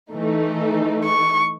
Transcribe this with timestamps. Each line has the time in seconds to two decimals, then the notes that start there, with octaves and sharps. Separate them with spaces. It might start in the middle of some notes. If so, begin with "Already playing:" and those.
0.11 E3 A3 D#4
1.04 C#6